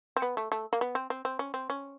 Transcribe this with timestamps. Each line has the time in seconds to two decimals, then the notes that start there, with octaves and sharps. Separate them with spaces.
0.16 C4
0.22 B3
0.37 A3
0.52 A3
0.73 A#3
0.81 B3
0.95 C4
1.10 C4
1.25 C4
1.39 C#4
1.54 C4
1.70 C#4